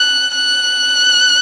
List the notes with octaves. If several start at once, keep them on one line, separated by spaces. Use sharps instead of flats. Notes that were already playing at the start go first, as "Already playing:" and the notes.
Already playing: F#6
F#6